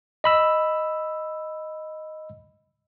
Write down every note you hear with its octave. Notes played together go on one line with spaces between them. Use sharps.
D#5 B5 E6